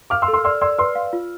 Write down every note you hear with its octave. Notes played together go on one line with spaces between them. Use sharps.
F5 D6 F6
C6 E6
A4
C6 E6
D5 C6 E6
D5 C6 E6
B4 C6 E6
F5
F4